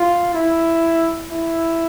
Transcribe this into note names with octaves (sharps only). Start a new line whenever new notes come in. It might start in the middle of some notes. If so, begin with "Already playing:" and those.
Already playing: F4
E4
E4